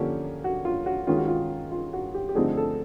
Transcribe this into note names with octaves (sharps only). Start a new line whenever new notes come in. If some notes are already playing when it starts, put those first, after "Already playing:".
Already playing: D3 F3 A#3 C#4 G4
F#4
F4
F#4
D#3 G#3 C#4 F4
F#4
F4
F4
F#4
G4
G4
D3 F3 A3 C4 D#4 G#4
A4